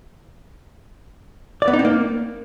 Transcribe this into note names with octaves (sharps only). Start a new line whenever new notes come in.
D5
B3
D#4
C4
A#3